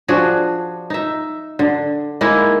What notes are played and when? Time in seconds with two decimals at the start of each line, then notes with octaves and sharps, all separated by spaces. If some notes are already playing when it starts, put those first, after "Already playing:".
0.08 F3 D4 F#4 G#4
0.90 D#4 E5
1.59 D3
2.21 G#3 A#3 D#4 E4